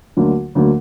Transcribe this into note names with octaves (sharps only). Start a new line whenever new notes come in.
D2 D3 F#3 A#3
D2 D3 F#3 A#3